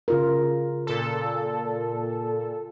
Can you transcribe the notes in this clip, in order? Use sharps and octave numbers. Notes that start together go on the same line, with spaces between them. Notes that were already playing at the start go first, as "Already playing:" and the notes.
C#3 F4 A#4
A#2 A4